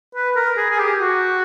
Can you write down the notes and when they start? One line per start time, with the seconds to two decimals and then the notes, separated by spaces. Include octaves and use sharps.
0.15 B4
0.36 A#4
0.57 G#4
0.70 G#4
0.79 G4
1.00 F#4